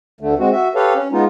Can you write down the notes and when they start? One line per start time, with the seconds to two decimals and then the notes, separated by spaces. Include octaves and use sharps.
0.21 D2 D3 A3
0.39 G#3 C4 F#4
0.53 F#4 E5
0.75 G4 A4 B4 C#5 F5
0.95 C#4
1.12 G#3 B3 D#4 F4